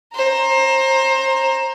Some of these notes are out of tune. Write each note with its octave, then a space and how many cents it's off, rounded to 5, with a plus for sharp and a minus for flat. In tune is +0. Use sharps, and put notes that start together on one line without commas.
C5 +30 A#5 +0